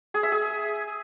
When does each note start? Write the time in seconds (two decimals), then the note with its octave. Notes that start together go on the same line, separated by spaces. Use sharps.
0.14 G#4
0.23 E5
0.32 G#4